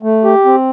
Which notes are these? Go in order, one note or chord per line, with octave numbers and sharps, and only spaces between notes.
A3
G4
C4